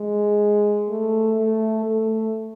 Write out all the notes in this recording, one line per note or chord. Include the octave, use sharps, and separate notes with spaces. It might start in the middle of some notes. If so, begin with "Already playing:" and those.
Already playing: G#3
A3
A3
A3